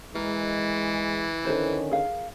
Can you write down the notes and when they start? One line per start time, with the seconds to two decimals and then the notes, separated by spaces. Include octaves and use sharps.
0.15 E3 G#3 A#4
1.45 D3 D#3 C#4 A4 B4 C5
1.91 G#4 A#4 F5